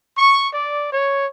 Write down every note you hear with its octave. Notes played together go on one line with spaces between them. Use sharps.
C#6
D5
C#5